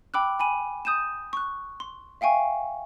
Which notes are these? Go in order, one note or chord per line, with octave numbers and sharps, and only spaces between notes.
G5 B5 D6 E6 F#6
G#5 B5 D#7
D#6 G6 D#7 E7
C#6 F#6
C6
E5 F5 G5 G#5 C#6